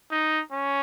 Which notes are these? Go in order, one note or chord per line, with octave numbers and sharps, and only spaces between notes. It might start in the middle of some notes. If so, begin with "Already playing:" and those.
D#4
C#4